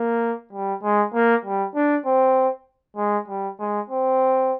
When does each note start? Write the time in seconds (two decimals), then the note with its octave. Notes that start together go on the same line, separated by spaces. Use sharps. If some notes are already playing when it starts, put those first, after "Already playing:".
Already playing: A#3
0.53 G3
0.83 G#3
1.14 A#3
1.45 G3
1.75 D4
2.06 C4
2.97 G#3
3.28 G3
3.59 G#3
3.90 C4